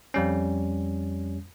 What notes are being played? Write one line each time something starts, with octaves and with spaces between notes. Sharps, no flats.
F2 G3 C#4